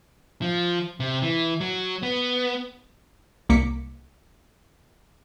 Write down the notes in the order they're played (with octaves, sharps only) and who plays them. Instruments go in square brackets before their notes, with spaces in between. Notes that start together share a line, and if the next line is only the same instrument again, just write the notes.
[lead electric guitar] F3
C3
E3
F#3
B3
[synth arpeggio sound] C2 A#3 D6 B6 C#7